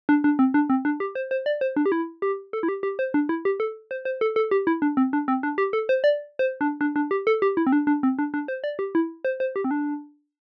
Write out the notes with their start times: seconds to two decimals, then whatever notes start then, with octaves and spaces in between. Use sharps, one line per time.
0.09 D4
0.24 D4
0.39 C4
0.54 D4
0.70 C4
0.85 D4
1.00 G4
1.15 C5
1.31 C5
1.46 D5
1.61 C5
1.76 D4
1.86 G4
1.92 E4
2.22 G4
2.53 A4
2.63 E4
2.69 G4
2.83 G4
2.99 C5
3.14 D4
3.29 E4
3.45 G4
3.60 A4
3.91 C5
4.05 C5
4.21 A4
4.36 A4
4.51 G4
4.67 E4
4.82 D4
4.97 C4
5.13 D4
5.28 C4
5.43 D4
5.58 G4
5.73 A4
5.89 C5
6.04 D5
6.39 C5
6.61 D4
6.81 D4
6.96 D4
7.11 G4
7.27 A4
7.42 G4
7.57 E4
7.67 C4
7.72 D4
7.87 D4
8.03 C4
8.19 D4
8.34 D4
8.48 C5
8.64 D5
8.79 G4
8.95 E4
9.25 C5
9.40 C5
9.56 G4
9.64 C4
9.71 D4